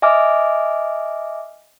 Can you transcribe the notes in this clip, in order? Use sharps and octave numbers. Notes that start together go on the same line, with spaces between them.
D#5 E5 G#5 D6 F6